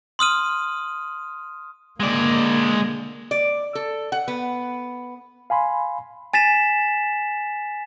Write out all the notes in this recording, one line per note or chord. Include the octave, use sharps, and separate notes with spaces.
C6 D#6 F6 D#7
D3 G#3 A#3 D5
D5
A4
F#5
B3
F5 G#5 B5 C6
G#5 A6 B6 E7